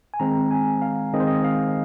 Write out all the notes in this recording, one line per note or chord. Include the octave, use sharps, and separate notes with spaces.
G#5
D#3 G#3 C4 A#5
G#5
F5
D#3 G#3 C4 D#5
C5
D#5
F5